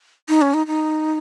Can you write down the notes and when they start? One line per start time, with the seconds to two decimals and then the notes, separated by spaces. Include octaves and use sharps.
0.29 D#4
0.42 C#4
0.54 D#4
0.67 D#4